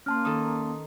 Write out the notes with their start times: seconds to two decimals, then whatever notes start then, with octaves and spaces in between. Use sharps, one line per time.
0.06 A#3 C#4 A5 C6 F6
0.25 D#3 A4 D#6